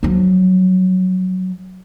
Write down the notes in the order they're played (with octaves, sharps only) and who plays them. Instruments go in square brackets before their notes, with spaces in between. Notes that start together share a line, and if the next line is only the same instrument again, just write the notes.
[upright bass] F3 F#3